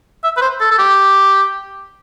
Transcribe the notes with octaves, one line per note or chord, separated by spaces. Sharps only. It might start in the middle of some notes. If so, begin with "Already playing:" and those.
E5
B4
C5
A4
A4
G4